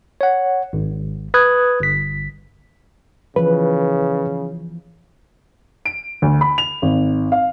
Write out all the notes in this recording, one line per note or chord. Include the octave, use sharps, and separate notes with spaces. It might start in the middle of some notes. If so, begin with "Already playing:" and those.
C#5 F#5
G#1
B4 B5 D#6 F#6 G#6
G1 B6
C#3 E3 F3 B4
D7
D2
B5
F7
G#1
F5